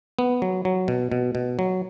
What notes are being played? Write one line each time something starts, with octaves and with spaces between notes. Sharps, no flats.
B3
F#3
F#3
B2
B2
B2
F#3